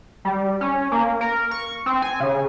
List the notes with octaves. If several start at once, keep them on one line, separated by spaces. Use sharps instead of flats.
G3
C#4
A#3
A#4
C#6
C4
G#5
C#3